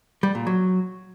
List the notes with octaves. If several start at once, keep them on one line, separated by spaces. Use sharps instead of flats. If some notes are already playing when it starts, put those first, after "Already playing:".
G3
A#2
F#3